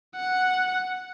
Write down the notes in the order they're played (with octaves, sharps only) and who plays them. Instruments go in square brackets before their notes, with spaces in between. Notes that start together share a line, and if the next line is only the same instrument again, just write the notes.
[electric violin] F#5